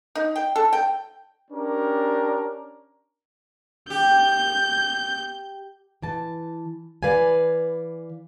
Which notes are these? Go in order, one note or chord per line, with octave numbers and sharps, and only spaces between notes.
D#4
G5
A4
G5
C#4 D4 G4 A#4
G4 G6
E3 A5
E3 B4 D5 F5 G#5